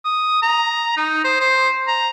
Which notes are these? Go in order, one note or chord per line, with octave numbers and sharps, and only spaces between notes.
D#6
A#5
D#4
C5
C5
A#5